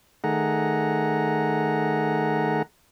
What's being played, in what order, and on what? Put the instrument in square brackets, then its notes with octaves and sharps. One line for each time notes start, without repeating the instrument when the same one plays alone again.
[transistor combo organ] D#3 A3 G#4 F#5 A#5